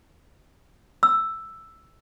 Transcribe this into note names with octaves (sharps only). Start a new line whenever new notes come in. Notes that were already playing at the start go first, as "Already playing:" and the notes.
E6